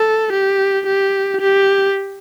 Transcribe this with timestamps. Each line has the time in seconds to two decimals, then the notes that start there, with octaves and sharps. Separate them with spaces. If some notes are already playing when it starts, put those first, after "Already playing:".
Already playing: A4
0.33 G4
0.87 G4
1.41 G4